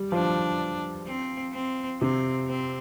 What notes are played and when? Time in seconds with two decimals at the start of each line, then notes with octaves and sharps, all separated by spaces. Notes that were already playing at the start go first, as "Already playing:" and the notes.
Already playing: G3
0.12 F3 D4
1.07 C4
1.53 C4
2.01 C3 C4
2.48 C4